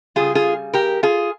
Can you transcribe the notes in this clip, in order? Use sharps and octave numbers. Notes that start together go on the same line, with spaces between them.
C#3 G3 F4 G#4
F4 G#4
G4 A#4
F4 G#4